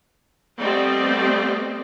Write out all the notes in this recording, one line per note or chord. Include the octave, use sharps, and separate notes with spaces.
G3 A3 B3 C4 D5 D#5